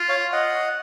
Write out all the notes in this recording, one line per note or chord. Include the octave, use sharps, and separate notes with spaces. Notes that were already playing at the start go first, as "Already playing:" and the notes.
Already playing: F4
C#5 F5
D#5 F#5